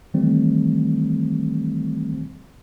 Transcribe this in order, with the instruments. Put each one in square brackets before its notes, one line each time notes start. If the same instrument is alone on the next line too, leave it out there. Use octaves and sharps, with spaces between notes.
[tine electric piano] D#3 E3 G3 A3 C4